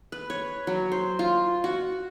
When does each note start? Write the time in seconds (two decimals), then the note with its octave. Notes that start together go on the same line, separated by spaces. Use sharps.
0.12 B4
0.30 C#5
0.67 F#3
0.92 C5
1.19 F4
1.64 F#4